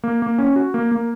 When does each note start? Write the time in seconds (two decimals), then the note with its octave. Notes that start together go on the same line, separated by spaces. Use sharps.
0.04 A#3
0.22 A#3
0.38 C#4
0.56 F#4
0.74 A#3
0.91 A#3